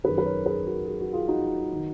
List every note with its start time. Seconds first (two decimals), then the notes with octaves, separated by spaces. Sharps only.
0.04 F#2 D#3 G#4 B4
0.18 B4
0.25 A#4 C#5
0.46 G#4 B4
0.67 F#4 A#4
0.87 G#4
1.00 F#4
1.13 F4 G#4
1.28 D#4 F#4
1.73 D#3